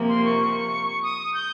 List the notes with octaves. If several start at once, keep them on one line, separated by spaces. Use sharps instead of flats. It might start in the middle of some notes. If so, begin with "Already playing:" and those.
Already playing: C3 F3 A#3
C6
C#6
D#6
G6